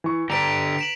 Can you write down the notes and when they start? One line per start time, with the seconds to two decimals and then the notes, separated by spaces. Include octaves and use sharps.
0.04 E3 C#6
0.30 D3 D4 G4 B4 A#5 B6 D7 F7
0.79 D7 E7 F#7